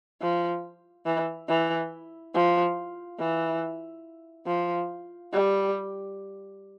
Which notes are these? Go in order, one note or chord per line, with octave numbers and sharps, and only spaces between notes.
F3
E3
E3
F3
E3
F3
G3